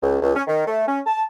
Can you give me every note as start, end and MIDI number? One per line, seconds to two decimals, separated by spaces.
0.02 0.16 37
0.22 0.32 37
0.35 0.42 61
0.47 0.66 51
0.66 0.84 57
0.87 1.00 61
1.06 1.23 81